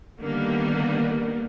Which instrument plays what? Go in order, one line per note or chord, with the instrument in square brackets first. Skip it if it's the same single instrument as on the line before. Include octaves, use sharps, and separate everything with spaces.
[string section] D3 D#3 G3 A#3 B3